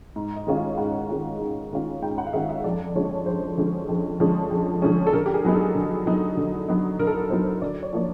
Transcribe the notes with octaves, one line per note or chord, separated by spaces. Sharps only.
G#2
D#5
D#3 G#3 C#4 F4
F5
G#2 F#5
D#3 G#3 C#4 F4
G#2
D#3 G#3 C#4 F4
G#2 G5
F#5
F5
D#3 G#3 C#4 F4 E5
E5
F2 D5
D3 F3 G#3 C#4 C#5
F2 C5
D3 F3 G#3 C#4
F2
D3 F3 G#3 C#4
F2
D3 F3 G#3 C#4
A4
D3 A#4
G4
G#4
F#3 B3 D#4
A4
D3
F#3 B3 D#4
D3
F#3 B3 D#4
D3 A#4
A4
A#4
F#3 B3 D#4 C5
D3 D5
C#5
F3 A#3 D5